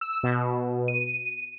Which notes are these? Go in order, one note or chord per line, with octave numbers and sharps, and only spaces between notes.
E6
B2
D#7